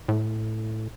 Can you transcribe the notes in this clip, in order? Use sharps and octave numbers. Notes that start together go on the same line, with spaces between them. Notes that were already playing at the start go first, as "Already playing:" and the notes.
A2